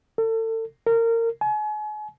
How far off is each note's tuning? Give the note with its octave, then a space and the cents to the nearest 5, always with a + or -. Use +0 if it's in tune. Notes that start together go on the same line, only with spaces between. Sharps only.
A4 +35
A#4 -25
G#5 +40